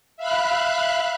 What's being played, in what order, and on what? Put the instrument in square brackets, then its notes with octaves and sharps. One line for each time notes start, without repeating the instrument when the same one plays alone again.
[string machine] E5 F5 B5 F#6